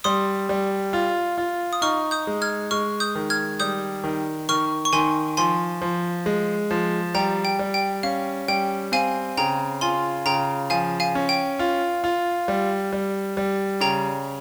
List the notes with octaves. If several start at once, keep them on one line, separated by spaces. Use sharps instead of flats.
G3 C6 D#6
G3
F4
F4
D#6
D#4 C#6 F6
D#6 G6
G#3
F6 G#6
G#3 C#6 F6
D#6 G6
D#3
F6 G#6
G3 D#6 G6
D#3
D#3 C#6 F6
C#6
D#3 G#5 C6
F3 G#5 C6
F3
G#3
F3
G3 G5 A#5
G5
G3
G5
C#4 F5
G3 G5
C4 F5 G#5
C#3 G5 A#5
F4 G#5 C6
C#3 G5 A#5
F3 F5 G#5
F5 G#5
C#4
G5
F4
F4
G3
G3
G3
C#3 G5 A#5